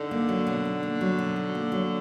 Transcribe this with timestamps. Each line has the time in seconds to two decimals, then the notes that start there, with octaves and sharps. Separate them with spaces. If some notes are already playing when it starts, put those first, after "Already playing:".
Already playing: D3 D#4
0.11 A#3
0.29 F#3
0.47 B2
0.65 D#4
0.83 A#3
1.01 F#3
1.19 B2
1.36 D#4
1.55 A#3
1.72 F#3